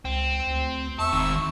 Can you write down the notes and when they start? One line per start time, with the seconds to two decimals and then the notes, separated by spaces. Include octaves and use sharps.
0.05 C#2 C4
0.47 D2
0.99 E2 E5 A5 C#6 E6
1.13 F1 D#3 C4